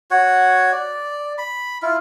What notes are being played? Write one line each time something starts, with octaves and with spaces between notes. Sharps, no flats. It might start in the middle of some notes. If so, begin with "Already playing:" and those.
F#4 C#5 F#5
D5
B5
E4 F4